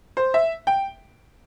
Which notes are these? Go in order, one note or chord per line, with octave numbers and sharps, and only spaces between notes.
C5
E5
G5